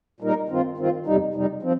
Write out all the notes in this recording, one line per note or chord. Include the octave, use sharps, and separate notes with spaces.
A#2 G3 D#4 A#4
G2 D#3 C4 F4
G2 D#3 C4 F4
F2 C3 G3 D#4
F2 C3 G3 D#4
F3 C4